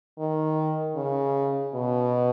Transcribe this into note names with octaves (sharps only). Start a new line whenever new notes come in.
D#3
C#3
B2